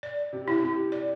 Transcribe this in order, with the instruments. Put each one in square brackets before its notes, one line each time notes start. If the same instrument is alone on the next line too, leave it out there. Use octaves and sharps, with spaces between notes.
[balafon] D5
[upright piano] C3
[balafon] E4
[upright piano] C3
[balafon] D5